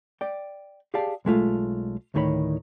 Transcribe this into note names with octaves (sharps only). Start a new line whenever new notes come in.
D5 G5
G4 G#4 D5 F5 G5 A5
B1 G#3 A3 F4
D2 A2 D#3 G#4 C#5 B5